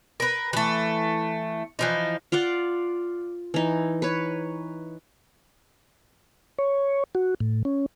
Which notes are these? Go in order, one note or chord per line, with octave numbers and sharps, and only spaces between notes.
A#4 B4
E3 A3
E3 F3 D#4
F4 D5 F5 F#5
E3 D#4
B4 C#5
C#5
F#4
A2
C#4